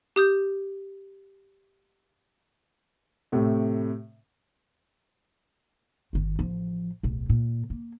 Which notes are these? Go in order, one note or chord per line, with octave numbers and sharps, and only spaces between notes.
G4 D#6 G6
A2 C3 A3
G1 D#3
A1 F3
D1 B1
A#2
A#3